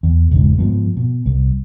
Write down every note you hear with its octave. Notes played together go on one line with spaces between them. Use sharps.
E2
E1 C#2 G#2
G#2 F3 B3
B2
C2